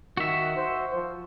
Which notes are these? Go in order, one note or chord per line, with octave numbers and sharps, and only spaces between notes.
D#3 F#4 E5
C5
F3